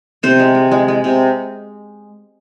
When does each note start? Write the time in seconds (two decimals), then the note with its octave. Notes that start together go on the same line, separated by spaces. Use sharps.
0.23 C3 C5
0.40 G#3
0.55 G#3
0.71 G#3
0.88 G#3
1.04 C3